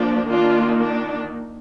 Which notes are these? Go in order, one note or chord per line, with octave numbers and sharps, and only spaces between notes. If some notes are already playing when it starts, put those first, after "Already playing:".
Already playing: F3 A#3 D4
D#3 A#3 D4 F4
D4